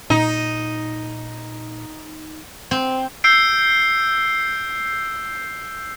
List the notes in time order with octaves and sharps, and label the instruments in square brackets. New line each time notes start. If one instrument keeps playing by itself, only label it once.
[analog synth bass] A#2 [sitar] D#4
[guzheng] C4
[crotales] E6 G6 C7 D7